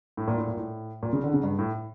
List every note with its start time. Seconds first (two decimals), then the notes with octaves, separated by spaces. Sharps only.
0.17 A2
0.28 A#2
0.37 A2
0.47 A#2
0.57 A2
1.03 A#2
1.13 C#3
1.24 D3
1.33 C#3
1.43 G2
1.59 A2